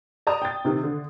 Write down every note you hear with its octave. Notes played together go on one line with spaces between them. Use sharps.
D5 A5 A#5 D#6
G5 A6
C3 D#3
D3